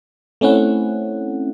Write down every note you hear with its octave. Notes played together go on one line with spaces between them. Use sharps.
A3 C4 C#4 E4 F#5